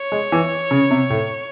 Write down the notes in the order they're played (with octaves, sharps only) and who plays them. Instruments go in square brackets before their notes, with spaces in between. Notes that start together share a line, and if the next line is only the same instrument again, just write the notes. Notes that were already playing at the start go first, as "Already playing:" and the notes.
Already playing: [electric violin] C#5
[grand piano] G#3
E3
C#3
C3
A2